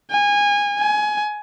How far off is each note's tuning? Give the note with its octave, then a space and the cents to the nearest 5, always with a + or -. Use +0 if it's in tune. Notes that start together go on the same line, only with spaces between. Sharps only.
G#5 -20
G#5 +20